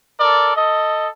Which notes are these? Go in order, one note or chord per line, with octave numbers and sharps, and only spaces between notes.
A4 A#4 D5
A4 D#5